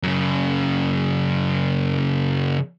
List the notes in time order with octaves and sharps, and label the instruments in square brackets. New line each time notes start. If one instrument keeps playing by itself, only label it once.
[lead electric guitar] F#2 C#3